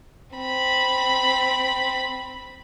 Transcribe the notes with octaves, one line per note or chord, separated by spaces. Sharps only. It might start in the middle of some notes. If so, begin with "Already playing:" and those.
C4 B5